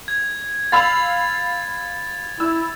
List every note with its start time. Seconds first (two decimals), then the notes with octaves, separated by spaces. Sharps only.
0.08 G#6
0.72 F5 B5 E6 A6 F7
2.40 E4 E6